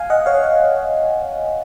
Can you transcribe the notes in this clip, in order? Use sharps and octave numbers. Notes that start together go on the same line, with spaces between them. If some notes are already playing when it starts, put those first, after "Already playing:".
Already playing: F5 G#5
D#5 F#5
C#5 F5